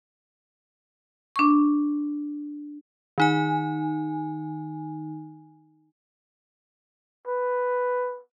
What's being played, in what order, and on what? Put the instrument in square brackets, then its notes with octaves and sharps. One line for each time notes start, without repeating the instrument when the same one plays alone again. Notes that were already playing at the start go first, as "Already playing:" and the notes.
[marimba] D4 C#6
[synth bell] D#3 D#4 G#5
[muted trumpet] B4